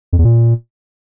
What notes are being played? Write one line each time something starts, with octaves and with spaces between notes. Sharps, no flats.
F2
E2
A#2